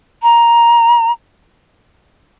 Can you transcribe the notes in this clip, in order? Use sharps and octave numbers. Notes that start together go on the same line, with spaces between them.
A#5